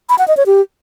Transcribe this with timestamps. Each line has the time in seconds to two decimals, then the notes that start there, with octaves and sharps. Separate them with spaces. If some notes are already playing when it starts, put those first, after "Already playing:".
0.09 B5
0.19 F#5
0.28 D#5
0.37 C#5
0.46 G4